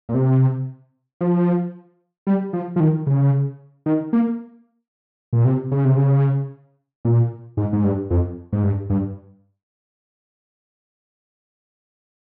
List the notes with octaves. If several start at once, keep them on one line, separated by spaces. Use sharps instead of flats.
A#2
C3
F3
G3
F3
F3
D#3
C#3
D#3
A#3
A#2
C3
C#3
C3
C#3
A#2
G#2
G#2
G2
F2
G#2
G2
G2